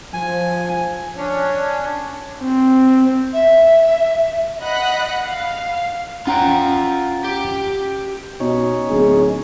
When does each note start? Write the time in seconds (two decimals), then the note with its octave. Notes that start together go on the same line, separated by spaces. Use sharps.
0.14 F3 G#5
1.17 C#4 D4 C#5
2.43 C4
3.33 E5
4.60 D#5 F#5 B5 F#6
5.24 F5
6.27 C#4 F4 F#5 G5 A#5
7.24 G4
8.40 B2 C#4 D#4 C#5
8.90 D1 G#4